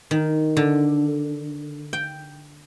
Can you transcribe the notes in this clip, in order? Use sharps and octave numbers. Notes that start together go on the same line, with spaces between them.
D#3
D3
G5